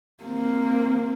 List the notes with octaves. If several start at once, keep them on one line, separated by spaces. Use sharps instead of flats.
A#3 C4